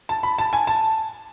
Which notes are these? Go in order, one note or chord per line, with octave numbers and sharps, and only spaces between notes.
A5
B5
A5
G#5
A5